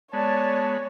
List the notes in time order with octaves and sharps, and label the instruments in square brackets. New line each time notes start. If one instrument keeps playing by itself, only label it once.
[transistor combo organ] G#3 B3 [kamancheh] C#5 [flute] D5 [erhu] A5